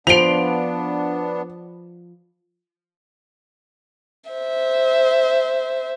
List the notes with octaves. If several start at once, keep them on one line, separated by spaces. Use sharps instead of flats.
F3 B3 D4 C6 D7 F7
C5 E5